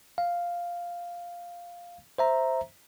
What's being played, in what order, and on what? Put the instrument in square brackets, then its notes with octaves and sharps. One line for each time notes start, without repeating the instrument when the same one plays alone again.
[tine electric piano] F5
C5 E5 A#5